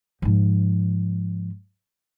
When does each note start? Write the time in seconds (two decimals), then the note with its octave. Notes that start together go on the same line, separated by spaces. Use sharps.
0.22 G#2 F3